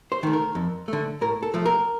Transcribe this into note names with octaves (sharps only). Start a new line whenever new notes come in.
C5
D#3 A3
A#4
F2
D3 A3
A2 A#4
A4
F3 A3
A#4